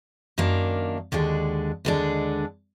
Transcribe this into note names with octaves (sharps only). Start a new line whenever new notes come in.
F#2 D#3 A#3 D4
D#2 D3 G#3 D4
D#2 D3 G#3 D4